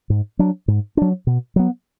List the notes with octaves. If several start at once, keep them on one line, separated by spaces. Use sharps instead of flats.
G#2
F#3 D4
G#2
F#3 D4
B2
F#3 B3